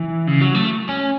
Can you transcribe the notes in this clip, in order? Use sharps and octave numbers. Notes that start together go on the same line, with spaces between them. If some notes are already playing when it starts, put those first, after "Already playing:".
Already playing: E3
C#3
F#3
A3
C#4